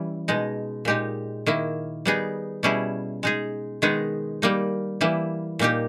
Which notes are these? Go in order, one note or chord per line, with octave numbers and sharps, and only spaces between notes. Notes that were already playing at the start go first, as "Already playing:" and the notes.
Already playing: E3 G3 C#4
B2 G#3 D#4
A#2 G#3 D#4 G4
D#3 A#3 E4
G3 B3 D#4 G#4
B2 G3 C#4 E4 G#4
G#3 D#4 G#4
D#3 G#3 B3 D#4 G#4
G3 A#3 D#4
E3 G3 A#3 E4
A#2 A#3 D#4 G4